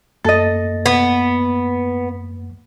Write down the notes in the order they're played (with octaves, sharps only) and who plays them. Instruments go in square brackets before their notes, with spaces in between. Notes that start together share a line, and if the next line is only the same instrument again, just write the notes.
[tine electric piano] F#2 A#3 A6 [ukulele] A4 D#5
[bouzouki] B3